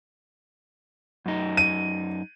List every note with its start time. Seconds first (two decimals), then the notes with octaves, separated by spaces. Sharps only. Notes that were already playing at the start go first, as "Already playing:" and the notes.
1.26 F#2 D#4
1.57 D#7